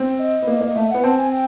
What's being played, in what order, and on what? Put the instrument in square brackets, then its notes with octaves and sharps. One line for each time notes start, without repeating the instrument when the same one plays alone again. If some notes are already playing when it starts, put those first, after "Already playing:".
Already playing: [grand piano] C4
[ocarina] D#5
[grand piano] B3
A#3
[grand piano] A#3 [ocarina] D#5
[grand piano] A3 [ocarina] E5
[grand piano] B3 [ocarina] F#5
[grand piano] C4 [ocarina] A5
[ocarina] G#5
G5